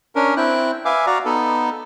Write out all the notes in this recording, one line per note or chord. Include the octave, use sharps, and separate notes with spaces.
C#4 D4 A#4
C4 E4 G5 F#6
B4 E5 F5 G#5 D6
F#4 D5 F5 A#5
B3 D#4 A4 B4